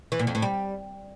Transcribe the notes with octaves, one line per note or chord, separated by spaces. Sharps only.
E3
A#2
F2
A2
G3